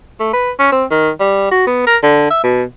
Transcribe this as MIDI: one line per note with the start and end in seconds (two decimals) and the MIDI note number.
0.20 0.30 57
0.33 0.51 71
0.59 0.70 61
0.72 0.85 60
0.91 1.10 51
1.20 1.49 55
1.51 1.66 66
1.67 1.82 59
1.87 1.96 70
2.03 2.30 50
2.30 2.42 76
2.44 2.63 47